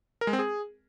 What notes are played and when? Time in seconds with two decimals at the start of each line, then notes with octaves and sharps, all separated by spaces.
0.21 A#4
0.27 G#3
0.33 C4
0.39 G#4